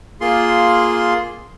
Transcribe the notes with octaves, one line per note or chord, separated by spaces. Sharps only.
A#3 F4 G#4 C6